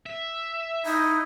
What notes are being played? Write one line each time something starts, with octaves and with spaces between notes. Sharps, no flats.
E5
D#4 E4